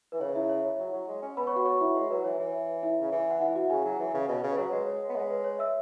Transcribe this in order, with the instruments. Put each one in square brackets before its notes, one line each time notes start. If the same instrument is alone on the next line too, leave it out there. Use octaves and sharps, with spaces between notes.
[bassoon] E3 [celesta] B4
[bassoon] C#3 [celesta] C#5
[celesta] E4 E5
C#5
C#5
[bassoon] F#3
F#3
G#3
C#4
[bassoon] B3 [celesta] B4 B5
[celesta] C#5 C#6
F#4 F#5
C#5 C#6
E4 E5
[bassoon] G#3 [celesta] C#5
[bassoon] F#3 [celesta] B4
[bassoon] E3 [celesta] C#5
[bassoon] E3
[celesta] E4 E5
[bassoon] C#3
E3
[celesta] F#5
E4 E5
F#4 F#5
[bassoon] C#3 [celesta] G#4 G#5
[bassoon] F#3
E3
C#3
B2
C#3
[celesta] B4
[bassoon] F#3 [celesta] C#5
[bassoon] G#3 [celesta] B4
[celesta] C#5
[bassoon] B3
[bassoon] G#3 [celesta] C#5
[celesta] B4
C#5
E5 E6